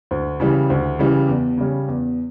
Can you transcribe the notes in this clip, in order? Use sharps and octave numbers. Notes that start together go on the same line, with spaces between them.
D2
C#3 E3 G3
D2
C#3 E3 G3
E2
C#3 G3 C#4
E2